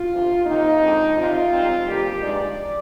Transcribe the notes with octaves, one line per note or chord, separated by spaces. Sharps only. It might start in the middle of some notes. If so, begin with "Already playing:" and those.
Already playing: F4
D2 C3 F3
C3 D#3 A#3 D#4
D3 G#3 C4
C3 G3 C4 D#4 F4
G#2 G3 C4 D#4
F2 D3 G3 A#3 G4
G2 F3 G#3 D#4 D5